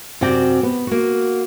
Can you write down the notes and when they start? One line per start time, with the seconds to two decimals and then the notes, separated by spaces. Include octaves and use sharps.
0.21 F#2 C3 C4 F#4 D5 G5
0.63 B3
0.87 A#3 F#4